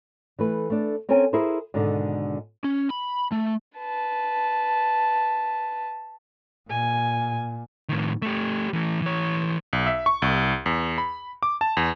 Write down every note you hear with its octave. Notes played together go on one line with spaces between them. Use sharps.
E3 A3 B4
A3 D4
C4 C#4 A4 A#4 G#5
E4 G#4 A#4 C5
G#2 B2 D3 D#3
C#4
B5
A3
B4 A5
A#2 G#5
A2 D#3
A3 G4
E3 A3
E3 C#5
B1
E5
C#6
C2
E2
B5
D6
A5
E2